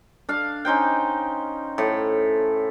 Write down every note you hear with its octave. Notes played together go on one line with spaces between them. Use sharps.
D4 F5
C#4 D#4 C5 G5
A2